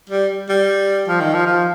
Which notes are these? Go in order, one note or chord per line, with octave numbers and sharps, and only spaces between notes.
G3
G3
F3
D#3
F3
F3